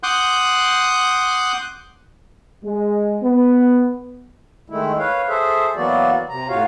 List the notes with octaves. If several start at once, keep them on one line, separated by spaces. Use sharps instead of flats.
F#5 C6 D6 D#6 F#6 G6
G#3
B3
D#3 G#3 A3 E4
B4 C#5 F5
G#4 A4 C5 E5
E3 F#3 A#3 B3 F#4 D5
C3 A#5
A2 F4 F#4 C#5 F5